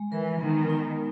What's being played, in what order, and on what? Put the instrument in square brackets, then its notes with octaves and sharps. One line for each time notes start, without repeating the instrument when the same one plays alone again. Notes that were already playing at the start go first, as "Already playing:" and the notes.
Already playing: [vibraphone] G#3
[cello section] E3 [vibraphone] A#4
[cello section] D#3 [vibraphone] B3
[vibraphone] D#4